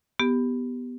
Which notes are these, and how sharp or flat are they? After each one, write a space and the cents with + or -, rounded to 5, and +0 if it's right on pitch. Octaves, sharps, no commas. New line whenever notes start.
B3 +0 G4 +0